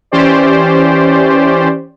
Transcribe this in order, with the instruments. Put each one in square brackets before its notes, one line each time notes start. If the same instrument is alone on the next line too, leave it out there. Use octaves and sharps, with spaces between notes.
[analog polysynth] E3 C#4 G4 C5 D5